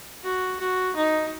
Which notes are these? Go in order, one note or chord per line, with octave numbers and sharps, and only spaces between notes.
F#4
F#4
D#4